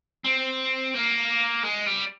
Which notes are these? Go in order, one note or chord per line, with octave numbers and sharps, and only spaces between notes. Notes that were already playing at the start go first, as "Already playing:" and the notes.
C4
A#3
G#3
G3